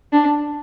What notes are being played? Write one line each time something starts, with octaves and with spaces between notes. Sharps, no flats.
D4